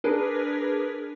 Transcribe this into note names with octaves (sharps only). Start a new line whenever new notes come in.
D4 G#4 A#4 B4